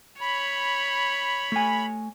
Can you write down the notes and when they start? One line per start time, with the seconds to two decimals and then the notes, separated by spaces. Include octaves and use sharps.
0.21 C#5 B5
1.52 A3 G#5